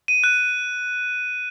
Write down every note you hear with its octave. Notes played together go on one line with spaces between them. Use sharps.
D#7
F#6